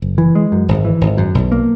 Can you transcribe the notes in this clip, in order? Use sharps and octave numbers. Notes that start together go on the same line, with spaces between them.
F#1
E3
G#3
F#2
G#1
E3
G#1
F#2
B1
A#3